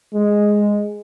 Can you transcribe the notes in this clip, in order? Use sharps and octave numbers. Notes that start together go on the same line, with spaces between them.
G#3